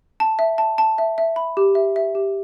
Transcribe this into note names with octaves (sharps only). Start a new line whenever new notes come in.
A5
E5
A5
A5
E5
E5
B5
G4
E5
E5
G4